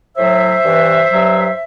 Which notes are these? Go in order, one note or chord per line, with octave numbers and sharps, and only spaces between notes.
A2 F#3 C5 E5
G2 E3
G2 F#3